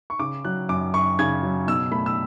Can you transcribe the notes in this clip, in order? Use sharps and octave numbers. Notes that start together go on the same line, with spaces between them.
C#6
C#3 D6
F#3 F#6
F#2 D6
F#2 C#6
C#3 G#6
F#3
B2 E6
A3 B5
E6